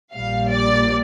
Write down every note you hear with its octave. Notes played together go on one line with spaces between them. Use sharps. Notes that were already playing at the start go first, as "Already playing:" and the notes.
A#1 A#2 G3 F5
D5